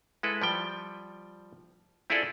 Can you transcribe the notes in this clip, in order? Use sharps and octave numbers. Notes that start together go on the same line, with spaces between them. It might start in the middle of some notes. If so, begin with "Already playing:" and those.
G#3 E4 A4 B4
F3 G3 G5
C4 E4 F4 G#4 A4 D5